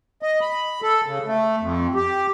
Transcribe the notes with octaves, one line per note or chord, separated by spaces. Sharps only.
D#5
B5
A4
C#3
A3
F2
G4